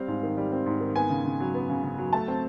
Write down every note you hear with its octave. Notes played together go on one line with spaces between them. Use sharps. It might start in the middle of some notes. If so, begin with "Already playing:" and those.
Already playing: G3 C4 F5
G#2
D#3
G3
C4
G#2
D#3
B3 G#5
C#3
C#3
F#3
B3
C#3
C#3
F#3
A3 A5
C4